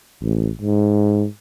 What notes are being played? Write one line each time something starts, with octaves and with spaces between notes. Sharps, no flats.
A1
G#2